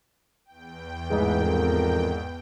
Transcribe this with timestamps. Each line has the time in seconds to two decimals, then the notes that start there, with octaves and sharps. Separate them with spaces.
0.45 E2 G5
1.10 A1 G#2 E3 G#3
1.41 F2 A#4